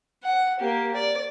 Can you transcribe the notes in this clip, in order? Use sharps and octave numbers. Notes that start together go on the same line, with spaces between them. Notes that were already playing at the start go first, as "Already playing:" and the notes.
F#5
A#3 G4
D5